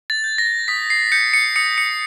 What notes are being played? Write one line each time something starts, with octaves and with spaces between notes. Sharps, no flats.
A6
G6
A#6
D#6 B6
C7
G6 C#7
C#7
D#6 C#7
C#7